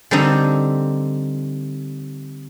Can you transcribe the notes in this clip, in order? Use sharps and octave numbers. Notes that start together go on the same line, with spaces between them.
D3 G3 C4 D#4 A4